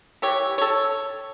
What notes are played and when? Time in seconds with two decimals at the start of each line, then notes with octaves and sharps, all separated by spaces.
0.22 E3 G4 C#5
0.58 A4 C#5